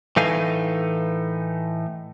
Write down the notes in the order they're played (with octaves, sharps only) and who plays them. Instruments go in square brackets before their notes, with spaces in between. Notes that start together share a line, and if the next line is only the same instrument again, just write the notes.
[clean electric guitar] A2 E3 A3 D#4 F5 G#5